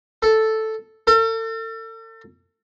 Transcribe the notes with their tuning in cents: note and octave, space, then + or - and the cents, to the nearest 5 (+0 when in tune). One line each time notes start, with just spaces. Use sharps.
A4 +0
A4 +40